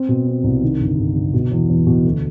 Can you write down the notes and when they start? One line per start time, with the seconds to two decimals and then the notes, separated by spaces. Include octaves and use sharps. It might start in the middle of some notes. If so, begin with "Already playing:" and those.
Already playing: C4
0.09 B2
0.26 C4
0.44 C2
0.62 D#3
0.80 G1
0.98 G1
1.15 G1
1.34 B2
1.51 E2
1.70 E2
1.87 B2
2.05 D2